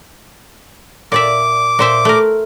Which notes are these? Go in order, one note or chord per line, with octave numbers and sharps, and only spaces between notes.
A#2 D5 E5 D6
A#2 C5 E5
A3 A#4